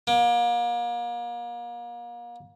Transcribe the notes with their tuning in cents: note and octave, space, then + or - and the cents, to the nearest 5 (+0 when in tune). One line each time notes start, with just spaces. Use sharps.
A#3 +35